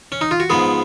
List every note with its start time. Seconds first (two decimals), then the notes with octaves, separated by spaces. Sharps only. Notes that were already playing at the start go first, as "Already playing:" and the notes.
0.12 C#4
0.21 D#4
0.31 F4
0.40 F#4
0.50 G#2 F3 B3 G#4